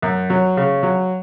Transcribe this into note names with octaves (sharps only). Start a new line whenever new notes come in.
F#2
F#3
C#3
F#3